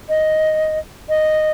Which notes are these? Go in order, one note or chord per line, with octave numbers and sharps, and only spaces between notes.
D#5
D#5